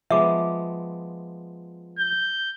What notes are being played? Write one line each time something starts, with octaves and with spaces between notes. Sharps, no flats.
F3 G#3 B3 E5 D6
G6